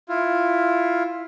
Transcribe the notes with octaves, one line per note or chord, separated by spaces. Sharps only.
E4 F4